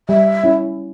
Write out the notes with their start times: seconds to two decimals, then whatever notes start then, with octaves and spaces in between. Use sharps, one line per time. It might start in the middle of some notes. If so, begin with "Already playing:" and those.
0.09 G3 E5
0.44 C#4 E4